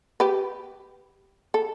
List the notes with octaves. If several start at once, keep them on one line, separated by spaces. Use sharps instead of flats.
G4 B4
A4